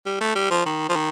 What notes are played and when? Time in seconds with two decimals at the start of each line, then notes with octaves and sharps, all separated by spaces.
0.06 G3
0.21 A3
0.35 G3
0.51 F3
0.66 D#3
0.89 F3
0.96 D#3